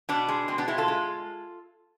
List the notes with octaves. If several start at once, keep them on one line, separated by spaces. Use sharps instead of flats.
B2 B3 D4
G#3
B2 C4
B3 D4
G#3 C4 E4
F4 A4
G#3